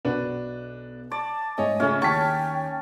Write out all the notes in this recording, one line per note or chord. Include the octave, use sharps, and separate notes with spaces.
B1 D4 F#4 B4 F#6
D5 A5
G#2 A3 C#5 D#5 G#5
C#3 A3 C#4 F4
D#2 G5 A5 C#6 B6